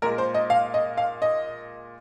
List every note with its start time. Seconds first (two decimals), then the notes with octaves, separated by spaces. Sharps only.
0.02 A#2 G#3 A#4
0.18 C5
0.35 D#5
0.50 F5
0.74 D#5
0.97 F5
1.22 D#5